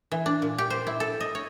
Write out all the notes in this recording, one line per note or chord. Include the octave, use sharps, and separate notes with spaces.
E3
D4
A#2
G4
C5
E4
A4
D#5
C#5